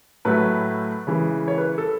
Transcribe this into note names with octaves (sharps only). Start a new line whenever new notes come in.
A2 F#3 A3 B4
C#3 E3 G#3
C#5
B4
A4